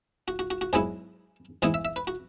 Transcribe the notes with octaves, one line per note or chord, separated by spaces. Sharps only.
F#4
F#4
F#4
F#4
G#2 F#3 B3 E4 G#4
G#2 E3 G#3 B3 E4 G#4
E5
E5
B4
F#4